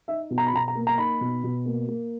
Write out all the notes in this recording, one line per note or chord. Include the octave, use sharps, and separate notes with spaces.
D#4 E5
B2
A#5
B5
B2 A#5
A#5
A#3
A#5
D#4 B5
B2
B2
A#3
A#3